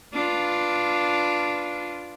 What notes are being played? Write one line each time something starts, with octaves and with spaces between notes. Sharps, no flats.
D4 F4 B4